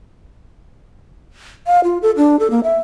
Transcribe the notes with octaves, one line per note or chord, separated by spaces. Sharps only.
F5
F4
A4
D4
A4
A#3
E5